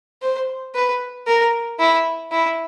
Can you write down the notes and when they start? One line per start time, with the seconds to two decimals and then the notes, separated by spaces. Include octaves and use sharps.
0.22 C5
0.75 B4
1.27 A#4
1.80 E4
2.32 E4